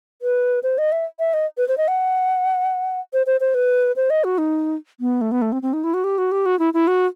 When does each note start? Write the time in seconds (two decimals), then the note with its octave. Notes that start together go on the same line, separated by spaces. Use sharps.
0.22 B4
0.63 C5
0.78 D#5
0.92 E5
1.19 E5
1.34 D#5
1.57 B4
1.68 C5
1.78 D#5
1.88 F#5
3.14 C5
3.26 C5
3.40 C5
3.54 B4
3.96 C5
4.10 D#5
4.24 F#4
4.38 D#4
5.00 B3
5.21 A3
5.32 B3
5.42 A3
5.52 C4
5.62 C4
5.73 D#4
5.84 E4
5.94 F#4
6.04 G4
6.18 F#4
6.32 G4
6.46 F#4
6.59 E4
6.74 E4
6.87 F#4